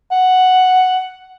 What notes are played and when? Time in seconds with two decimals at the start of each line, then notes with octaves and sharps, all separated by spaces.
0.12 F#5